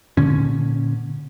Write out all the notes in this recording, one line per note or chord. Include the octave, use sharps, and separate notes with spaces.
A#2 D3 C#4